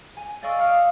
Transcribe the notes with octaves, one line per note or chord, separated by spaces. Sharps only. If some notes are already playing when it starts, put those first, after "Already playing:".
G#5
D5 D#5 F5 C#6 E6 D7
F5 D#6 F6 C#7 D7